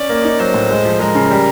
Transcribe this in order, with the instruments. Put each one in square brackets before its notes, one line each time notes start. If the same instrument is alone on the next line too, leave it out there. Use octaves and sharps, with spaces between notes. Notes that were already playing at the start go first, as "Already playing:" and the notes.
Already playing: [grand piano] C#4 [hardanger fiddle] D5
[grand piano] A#3
D#4
[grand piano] F#3 [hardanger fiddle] C5
[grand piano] A2
G#3
F3
[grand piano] G#3 [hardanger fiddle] A#4
[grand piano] C#3
G3